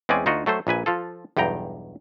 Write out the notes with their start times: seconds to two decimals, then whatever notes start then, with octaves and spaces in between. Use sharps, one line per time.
0.09 E2 G#3 C4 C#4 D5 G#5
0.26 D2 D#4 F4 F#4 D#5
0.46 F#3 A3 A4 C5
0.67 A#1 A#2 B4 G#5
0.86 F3 F4 A4
1.37 B1 E2 G2 G5 A#5